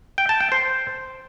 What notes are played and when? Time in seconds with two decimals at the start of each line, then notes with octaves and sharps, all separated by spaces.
0.18 G5
0.29 A5
0.40 G5
0.52 C5